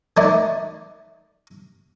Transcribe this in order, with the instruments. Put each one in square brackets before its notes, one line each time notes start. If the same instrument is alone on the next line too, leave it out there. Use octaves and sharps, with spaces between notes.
[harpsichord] E3 A3 D#4 E4 D5